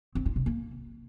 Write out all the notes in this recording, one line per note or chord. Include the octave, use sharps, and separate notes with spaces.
C4
F4
C3
A#3